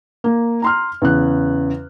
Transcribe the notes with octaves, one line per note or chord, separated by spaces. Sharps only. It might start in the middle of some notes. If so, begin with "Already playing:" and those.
A#3
A#5 C6 F6
E2 C#3 F#6